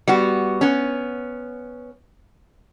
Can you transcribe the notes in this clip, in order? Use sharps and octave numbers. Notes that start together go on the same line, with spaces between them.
G3 B3 F#4
B3 C#4